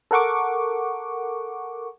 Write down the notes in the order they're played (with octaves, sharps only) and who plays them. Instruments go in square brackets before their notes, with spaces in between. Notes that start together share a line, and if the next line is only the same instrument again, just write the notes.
[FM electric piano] A4 A#4 F#5 C#6 D6